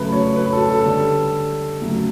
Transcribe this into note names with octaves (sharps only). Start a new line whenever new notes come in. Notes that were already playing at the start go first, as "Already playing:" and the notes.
Already playing: C#3 F#3 A3 B4
C#5
B4
A4
A4
D3 G3
C#3 F#3 A3